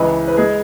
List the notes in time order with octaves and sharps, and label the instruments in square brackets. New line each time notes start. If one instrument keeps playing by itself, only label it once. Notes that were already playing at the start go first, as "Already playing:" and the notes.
Already playing: [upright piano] C#2 C#3 E3 B4
B4
G#3 G#4